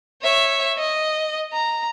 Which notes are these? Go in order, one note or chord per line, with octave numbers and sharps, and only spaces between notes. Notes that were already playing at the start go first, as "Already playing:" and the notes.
C#5 E5
D#5
A#5